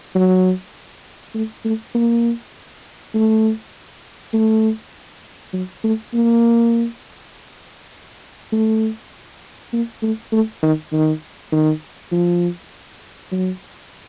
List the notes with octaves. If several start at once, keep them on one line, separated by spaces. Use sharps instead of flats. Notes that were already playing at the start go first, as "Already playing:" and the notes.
F#3
A3
A3
A#3
A3
A3
F#3
A3
A#3
A3
A#3
A3
A3
D#3
D#3
D#3
F3
F#3